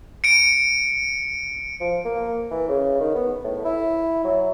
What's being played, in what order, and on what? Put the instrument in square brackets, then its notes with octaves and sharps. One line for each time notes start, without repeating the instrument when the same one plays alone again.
[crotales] C#7 D7
[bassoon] F3
A#3
E3
C#3
D#3
B3
A2
E4
F#3